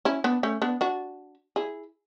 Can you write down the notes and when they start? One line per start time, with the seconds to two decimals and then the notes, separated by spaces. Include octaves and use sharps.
0.05 C#4 E4
0.24 B3 D4
0.43 A3 C#4
0.62 B3 D4
0.81 D4 F#4
1.56 E4 G#4